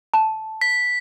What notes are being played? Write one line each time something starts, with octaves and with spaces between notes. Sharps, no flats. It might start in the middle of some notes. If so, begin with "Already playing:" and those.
A5
B6